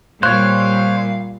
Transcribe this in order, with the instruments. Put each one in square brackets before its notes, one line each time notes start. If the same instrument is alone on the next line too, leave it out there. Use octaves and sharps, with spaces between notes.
[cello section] A#2 G3 [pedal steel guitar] C5 C#5 [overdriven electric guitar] F5 [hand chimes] F#6